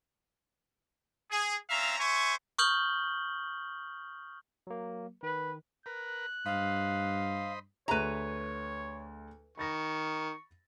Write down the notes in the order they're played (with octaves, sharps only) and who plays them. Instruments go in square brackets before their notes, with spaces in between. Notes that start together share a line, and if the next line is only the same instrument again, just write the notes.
[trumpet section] G#4
C4 C#4 E5 F5 A#5
C5 E5 G#5 C#6
[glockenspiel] C#6 D#6 F6 G6 F#7 G7
[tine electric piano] F#3 A#3
[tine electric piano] D#3 [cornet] B4
[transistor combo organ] A#4 B4 [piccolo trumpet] F#6
[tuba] G2 [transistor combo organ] C5 D#5 B5 [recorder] F5
[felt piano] D2 G#4 E5 [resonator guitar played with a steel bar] B4 A#5 [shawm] C#5
[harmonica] D#3 [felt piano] B5 A6 A#6 [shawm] C#6